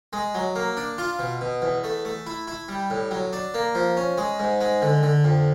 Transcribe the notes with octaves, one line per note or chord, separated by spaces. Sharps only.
G#3
F#3
A#3
D4
F4
B2
B2
E2
A3
A3
E4
E4
G3
A2
F#3
D4
A#3
F3
C#4
G#3
G#2
G#3
D3
D3
F2